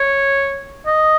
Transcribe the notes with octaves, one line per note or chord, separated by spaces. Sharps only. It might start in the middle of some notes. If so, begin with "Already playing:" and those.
Already playing: C#5
D#5